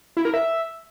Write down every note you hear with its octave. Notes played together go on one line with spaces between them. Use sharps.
E4
A#4
E5